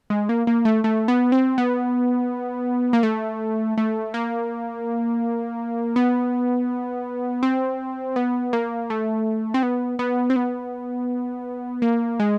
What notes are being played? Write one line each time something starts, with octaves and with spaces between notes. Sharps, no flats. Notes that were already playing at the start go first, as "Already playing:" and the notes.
G#3
A#3
A#3
A3
A3
B3
C4
B3
A#3
A3
A3
A#3
B3
C4
B3
A#3
A3
C4
B3
B3
C4
B3
A#3
G#3